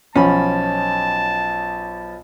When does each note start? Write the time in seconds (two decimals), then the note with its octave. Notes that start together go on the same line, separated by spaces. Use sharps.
0.15 B1 F3 C#4 A5 B5